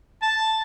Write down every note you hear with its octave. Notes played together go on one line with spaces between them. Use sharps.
A5